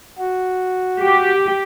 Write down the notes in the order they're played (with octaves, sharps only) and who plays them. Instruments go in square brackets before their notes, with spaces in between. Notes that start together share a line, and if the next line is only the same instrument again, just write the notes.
[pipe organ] F#4
[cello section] G4